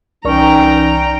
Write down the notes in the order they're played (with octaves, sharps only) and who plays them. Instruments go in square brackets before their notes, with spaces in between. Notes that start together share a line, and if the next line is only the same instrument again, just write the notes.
[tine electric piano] C2 D5 C#6 [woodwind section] E3 C#4 D#4 [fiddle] G5 A#5